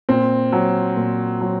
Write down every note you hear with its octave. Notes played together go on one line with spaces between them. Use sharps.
A#2 C4
F#3
A#2
F#3